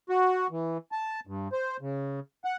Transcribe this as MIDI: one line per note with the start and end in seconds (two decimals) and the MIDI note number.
0.09 0.47 66
0.51 0.78 52
0.92 1.20 81
1.27 1.48 43
1.52 1.77 72
1.81 2.20 49
2.44 2.57 78